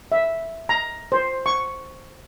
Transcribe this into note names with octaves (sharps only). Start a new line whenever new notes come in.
E5
A#5
C5
C#6